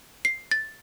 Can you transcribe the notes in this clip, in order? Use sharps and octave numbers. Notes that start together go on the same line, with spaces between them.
C7
A6